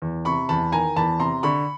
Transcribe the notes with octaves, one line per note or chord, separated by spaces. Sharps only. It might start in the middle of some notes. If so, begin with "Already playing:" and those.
E2
C3 B5 C#6
E2 A5 B5
D#3 G#5 A#5
E2 A5 B5
C3 A#5 C6
D3 B5 C#6